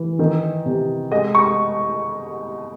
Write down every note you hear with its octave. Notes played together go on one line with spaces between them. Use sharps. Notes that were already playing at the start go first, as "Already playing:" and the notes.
Already playing: E3
D#3
C3
G#3 D#5
C#6